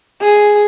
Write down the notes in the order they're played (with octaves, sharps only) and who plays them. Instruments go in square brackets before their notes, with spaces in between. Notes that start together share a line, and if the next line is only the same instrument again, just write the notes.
[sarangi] G#4